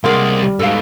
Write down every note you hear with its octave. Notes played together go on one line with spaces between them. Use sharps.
C2 G#3 A#3 D5 F#5 C6 F6
G3
G#2 B2 A4 F5